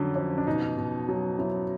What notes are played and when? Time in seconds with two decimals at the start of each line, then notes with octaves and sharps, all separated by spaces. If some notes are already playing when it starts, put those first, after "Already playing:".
Already playing: F2 D3 F#3 C#4
0.16 F2
0.38 D4
0.47 B2 D#4
0.77 B2
1.09 F#3
1.39 F#3 E4